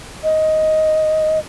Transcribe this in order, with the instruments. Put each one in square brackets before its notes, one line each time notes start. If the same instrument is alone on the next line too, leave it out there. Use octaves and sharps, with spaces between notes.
[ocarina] D#5